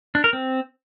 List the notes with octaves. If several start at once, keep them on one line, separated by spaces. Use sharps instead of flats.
D4
A#4
C4